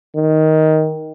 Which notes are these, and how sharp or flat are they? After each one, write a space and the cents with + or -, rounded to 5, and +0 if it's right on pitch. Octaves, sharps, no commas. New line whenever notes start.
D#3 +10